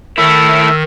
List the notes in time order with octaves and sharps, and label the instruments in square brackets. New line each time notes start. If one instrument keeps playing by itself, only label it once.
[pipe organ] D#3 [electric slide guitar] A3 E4 [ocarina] E6